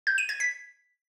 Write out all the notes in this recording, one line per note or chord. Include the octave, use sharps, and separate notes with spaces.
G6
D#7
G#6
B6